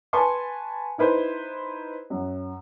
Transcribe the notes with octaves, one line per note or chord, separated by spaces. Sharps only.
B4 G#5 A5 C6 C#6
D#4 E4 B4 C5
F#2